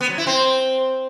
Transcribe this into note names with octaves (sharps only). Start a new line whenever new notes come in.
B3
F#3
E4
C4